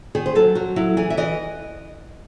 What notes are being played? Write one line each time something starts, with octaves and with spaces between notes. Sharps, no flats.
D#3 G#4
C5
F#3 A4
F#3 F#4
F#3 E4
E3 G#4
E5
E3 D#5